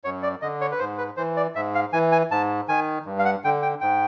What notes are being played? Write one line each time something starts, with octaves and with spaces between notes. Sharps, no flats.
F#2 C#5
D5
D3 D#5
C#5
B4
G#2 C5
B4
E3 C5
D5
G#2 E5
F5
E3 G#5
G#5
G#2 A5
D#3 G#5
G2
F5
F#5
D3 G5
G5
G#2 G5